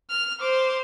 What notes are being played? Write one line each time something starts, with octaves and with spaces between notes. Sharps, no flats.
F6
C5 D6